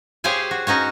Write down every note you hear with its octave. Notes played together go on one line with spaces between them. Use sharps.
G4 G#4 C5 C#5 F5 G#5
F#4
C#4 D#4 F#4 C#5